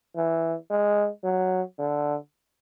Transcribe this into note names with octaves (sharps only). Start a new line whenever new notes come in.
E3
G#3
F#3
D3